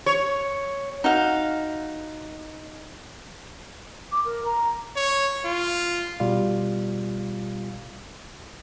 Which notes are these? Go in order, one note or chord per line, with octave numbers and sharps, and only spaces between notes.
C#5
D#4 F#4 F5
D6
A#4
A#5
C#5
F4
B2 G3 F4 F5